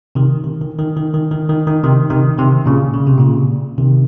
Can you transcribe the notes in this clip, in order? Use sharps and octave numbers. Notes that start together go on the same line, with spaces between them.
C3 D#3
D#3
D#3
D#3
D#3
D#3
D#3
D#3
D#3
C3 D#3
C3 D#3
C3 D#3
A#2 C#3
C#3
C3
A#2 C#3
C3 D#3